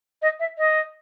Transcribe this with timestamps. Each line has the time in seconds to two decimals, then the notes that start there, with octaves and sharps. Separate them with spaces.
0.22 D#5
0.40 E5
0.58 D#5